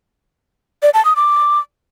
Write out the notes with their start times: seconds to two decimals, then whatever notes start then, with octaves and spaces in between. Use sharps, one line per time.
0.83 D5
0.94 A5
1.05 D#6
1.16 D6